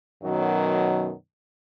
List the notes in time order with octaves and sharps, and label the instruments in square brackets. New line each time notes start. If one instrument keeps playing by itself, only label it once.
[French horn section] F#2 B2 D#3 F#3